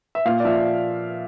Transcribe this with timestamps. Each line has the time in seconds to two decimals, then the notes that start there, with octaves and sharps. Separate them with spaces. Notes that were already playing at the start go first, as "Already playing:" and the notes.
0.15 E5
0.25 A#2 F5
0.40 D5
0.45 F3 E5